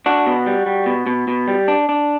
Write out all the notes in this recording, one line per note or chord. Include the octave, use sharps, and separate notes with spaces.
D4 F#4
B2
G3
G3
B2
B2
B2
G3
D4
D4